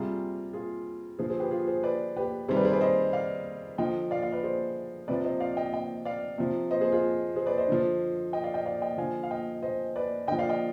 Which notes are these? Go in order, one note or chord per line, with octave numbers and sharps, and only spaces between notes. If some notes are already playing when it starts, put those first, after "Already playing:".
Already playing: C3 G3 F4 G#4
F4 G#4
D3 F3 G#4 C5
G#4 C5
G4 B4
F4 G#4
G#4 C5
B4 D5
G4 B4
C3 D#3 G3 G#4 C5
B4 D5
G#4 C5
B4 D5
C5 D#5
D5 F5
D3 F3 D#5 G5
D5 F5
D5 F5
B4 D5
G#4 C5
C3 F3 B4 D5
C5 D#5
D5 F5
D#5 G5
D#5 G5
D5 F5
C3 F3
C5 D#5
G#4 C5
F4 G#4
G#4 C5
B4 D5
C5 D#5
D3 F3
D#5 G5
D5 F5
D#5 G5
D5 F5
D#5 G5
D3 F3 F5 G#5
F5
D#5 G5
C5 D#5
B4 D5
D3 F3 D#5 G5
D5 F5
D#5 G5